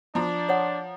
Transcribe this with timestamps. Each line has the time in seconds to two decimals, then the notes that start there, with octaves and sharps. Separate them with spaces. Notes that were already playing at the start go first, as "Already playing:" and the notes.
0.15 F3 D4 A#5
0.49 C#5 F#5